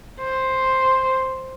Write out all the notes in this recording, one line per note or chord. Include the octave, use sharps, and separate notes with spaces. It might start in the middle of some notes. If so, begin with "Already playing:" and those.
C5